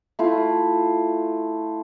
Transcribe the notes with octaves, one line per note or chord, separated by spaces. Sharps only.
A3 E4 F4